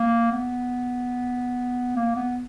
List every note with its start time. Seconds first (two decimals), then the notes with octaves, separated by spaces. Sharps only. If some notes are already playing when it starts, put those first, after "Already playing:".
Already playing: A#3
0.32 B3
1.96 A#3
2.16 B3